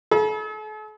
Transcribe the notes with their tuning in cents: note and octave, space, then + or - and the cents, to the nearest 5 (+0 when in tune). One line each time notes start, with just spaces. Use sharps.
A4 -45 B5 -45